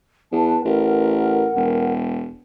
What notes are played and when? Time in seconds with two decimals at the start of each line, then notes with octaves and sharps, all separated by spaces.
0.32 E2 B4 A5
0.65 A1 A#4 F#5
1.56 E1